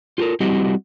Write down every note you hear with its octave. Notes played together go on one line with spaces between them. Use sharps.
F4 G4 A4 A#4
G3 C4 E4 F#4 G4 D#5